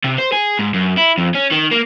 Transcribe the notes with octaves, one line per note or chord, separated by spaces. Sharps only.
C3
C5
G#4
G#2
F#2
E4
F2
C#4
D#3
A#3